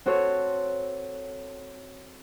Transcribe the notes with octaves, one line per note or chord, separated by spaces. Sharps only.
C4 F#4 A4 C5 C#5